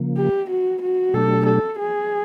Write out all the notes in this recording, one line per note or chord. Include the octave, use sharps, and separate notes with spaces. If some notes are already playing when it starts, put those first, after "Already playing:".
Already playing: C#3 F3 A#3
G4
F#4
F#4
B2 F#3 A3 D4 G4 A4
A4
G#4